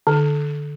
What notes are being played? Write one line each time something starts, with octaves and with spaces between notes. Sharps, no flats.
D3